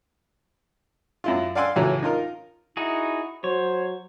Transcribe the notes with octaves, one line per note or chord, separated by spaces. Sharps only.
F#2 E4 F4
D5 F5 F#5 G#5 C6 E6
C#2 A2 E3 F#3 F#4 A#5
D#4 F4 A#4
D#4 E4 F#4 G#4
F#3 C5 C#5